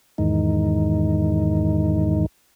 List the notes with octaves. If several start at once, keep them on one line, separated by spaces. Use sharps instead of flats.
E2 G#2 D#3